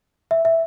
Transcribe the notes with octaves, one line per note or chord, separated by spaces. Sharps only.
E5
E5